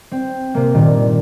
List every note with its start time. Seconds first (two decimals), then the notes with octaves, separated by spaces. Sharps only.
0.11 C4
0.54 C3 A#3
0.74 G2 A#2 D#3